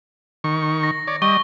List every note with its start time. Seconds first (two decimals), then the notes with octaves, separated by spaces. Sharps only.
0.44 D#3 C#6
0.83 A#6
1.07 C#5 D5
1.22 G3 D#5 C#6 G7